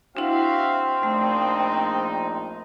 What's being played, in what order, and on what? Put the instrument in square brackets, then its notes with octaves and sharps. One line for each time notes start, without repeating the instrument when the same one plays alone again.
[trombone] C4 [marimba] D4 E4 [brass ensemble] F#4 E5 F5
[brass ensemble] A#1 D#4 [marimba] A3